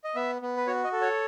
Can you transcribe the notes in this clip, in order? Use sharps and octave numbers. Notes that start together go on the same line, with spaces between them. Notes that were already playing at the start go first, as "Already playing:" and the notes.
D#5
B3 E5
B3
B4
F#4 C#5
D#5
A4
C#5